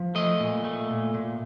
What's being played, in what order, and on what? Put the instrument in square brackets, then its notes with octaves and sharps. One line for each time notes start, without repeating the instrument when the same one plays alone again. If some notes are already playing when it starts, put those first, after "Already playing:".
Already playing: [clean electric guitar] F3
A3 D#5
A#2
A3
A#2
A#2